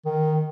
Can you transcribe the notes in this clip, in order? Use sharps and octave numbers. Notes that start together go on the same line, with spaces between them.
D#3